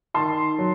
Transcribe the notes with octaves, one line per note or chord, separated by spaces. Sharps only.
D#3 A5 C6
F#3